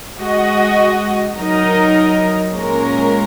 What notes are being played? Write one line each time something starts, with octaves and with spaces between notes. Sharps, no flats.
G#3 F#4 D#5
F#3 D#4 A#4 D#5
A#2 G#3 C#4 A#4